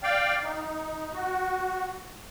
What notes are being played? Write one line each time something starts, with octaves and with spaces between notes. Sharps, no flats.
D5 F5 G5
D#4
F#4